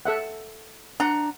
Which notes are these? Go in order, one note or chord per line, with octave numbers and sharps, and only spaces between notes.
A4 E5 F#5
D4 F#5 A#5